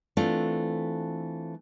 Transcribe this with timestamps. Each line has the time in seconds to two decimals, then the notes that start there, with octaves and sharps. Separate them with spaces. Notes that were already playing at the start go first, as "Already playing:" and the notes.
0.17 E3 A3 C4 D4 F4 A4